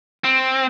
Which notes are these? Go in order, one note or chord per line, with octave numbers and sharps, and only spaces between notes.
C4